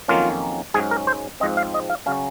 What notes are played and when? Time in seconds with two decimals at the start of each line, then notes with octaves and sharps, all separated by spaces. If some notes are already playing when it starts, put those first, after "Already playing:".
0.08 F2 D#3 F#3 A#3 C#4 F4
0.74 G#2 F#3 C#4 G#4
0.91 A#4
1.07 C5
1.40 G#2 F3 C4 D#5
1.57 F5
1.74 D#5
1.90 F5
2.06 C#3 F#3 C#4 F5